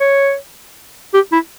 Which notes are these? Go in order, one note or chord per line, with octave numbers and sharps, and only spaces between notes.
C#5
G4
E4